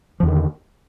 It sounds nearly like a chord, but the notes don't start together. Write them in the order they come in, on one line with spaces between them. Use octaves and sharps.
F3 E2 D3 D#3